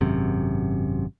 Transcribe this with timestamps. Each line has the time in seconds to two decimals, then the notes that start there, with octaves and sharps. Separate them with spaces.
0.01 G#1 F#2 C3